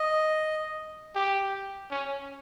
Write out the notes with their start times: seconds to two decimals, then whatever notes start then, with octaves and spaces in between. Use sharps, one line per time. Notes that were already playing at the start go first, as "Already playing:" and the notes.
Already playing: D#5
1.16 G4
1.91 C#4